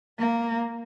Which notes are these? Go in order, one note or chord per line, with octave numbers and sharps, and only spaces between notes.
A#3